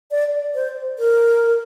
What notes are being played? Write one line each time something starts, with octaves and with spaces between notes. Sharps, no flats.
D5
C5
A#4